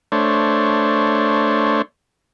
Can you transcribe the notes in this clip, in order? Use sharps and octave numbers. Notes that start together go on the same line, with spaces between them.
A3 D4 C5 C#5